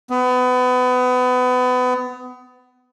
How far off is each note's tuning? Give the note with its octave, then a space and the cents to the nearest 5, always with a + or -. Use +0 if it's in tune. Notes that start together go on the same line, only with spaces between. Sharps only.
B3 +30